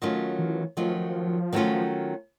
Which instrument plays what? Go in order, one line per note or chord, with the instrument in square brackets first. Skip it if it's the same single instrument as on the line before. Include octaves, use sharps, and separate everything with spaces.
[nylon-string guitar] D#3 F#3 A3 C#4 F4
[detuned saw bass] E3
[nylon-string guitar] D#3 F#3 A3 C#4 F4 [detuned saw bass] F3
[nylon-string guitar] D#3 F#3 A3 C#4 F4